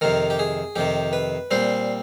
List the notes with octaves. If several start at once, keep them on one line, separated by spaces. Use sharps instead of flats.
F2 C3 D#3 A#4
G4
G#4
F2 C3 D#3 G4
B4
A#2 G3 C4 C5